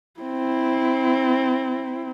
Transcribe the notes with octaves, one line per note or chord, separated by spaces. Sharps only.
C4 E4